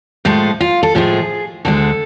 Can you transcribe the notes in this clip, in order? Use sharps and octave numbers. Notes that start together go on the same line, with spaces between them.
A2 F3 G#3 A4
F4
A4
A2 F3 G#3 G#4
D2 D3 G#3 A4